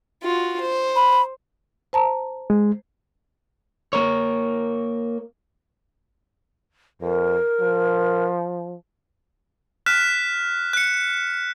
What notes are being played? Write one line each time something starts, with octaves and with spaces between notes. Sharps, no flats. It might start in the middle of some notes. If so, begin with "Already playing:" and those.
F4 F#4
C5
B5
C5 A5 A#5
G#3
A#3 A#4 C#5
F2 A#4
F3
F6 F#6 B6 E7
F#6 C#7